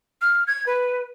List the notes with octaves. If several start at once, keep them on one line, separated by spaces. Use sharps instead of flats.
F6
G#6
B4